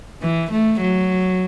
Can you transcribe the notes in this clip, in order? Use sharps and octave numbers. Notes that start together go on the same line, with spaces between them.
E3
A3
F#3